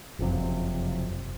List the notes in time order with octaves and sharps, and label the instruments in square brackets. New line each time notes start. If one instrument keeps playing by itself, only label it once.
[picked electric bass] F#1 F2 C3